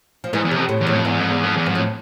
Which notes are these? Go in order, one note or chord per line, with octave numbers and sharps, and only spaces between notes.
F3
G#2 E3
E2
C3
F2
A2
E2
A2
F2
E2 G#2
F2
E2
F2
E2
F2 G#2
A2